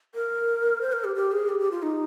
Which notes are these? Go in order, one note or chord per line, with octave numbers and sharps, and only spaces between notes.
A#4
C5
A#4
G4
G4
G#4
G4
G4
F4
D#4